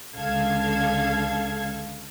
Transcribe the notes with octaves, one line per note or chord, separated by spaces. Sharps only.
C#2 D3 A4 F5 G#6